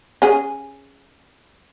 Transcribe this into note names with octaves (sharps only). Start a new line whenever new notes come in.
C#4 G#4